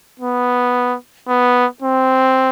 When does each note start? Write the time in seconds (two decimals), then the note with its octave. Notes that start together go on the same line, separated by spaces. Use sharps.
0.20 B3
1.28 B3
1.82 C4